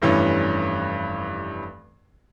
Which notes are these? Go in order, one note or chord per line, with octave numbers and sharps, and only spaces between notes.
F1 G2 E3 C#4